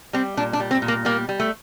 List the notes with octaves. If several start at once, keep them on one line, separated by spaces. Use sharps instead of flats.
G3 C4
A#2 D4
D4
G3
C4
A#2
A#3
G3 A#3
G3
A3